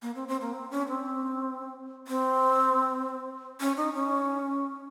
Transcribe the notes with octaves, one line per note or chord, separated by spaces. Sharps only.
A#3
C4
C4
A#3
C4
C#4
C4
C4
C#4
D#4
C#4